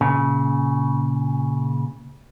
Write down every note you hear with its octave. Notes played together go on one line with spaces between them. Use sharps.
A#2 C#3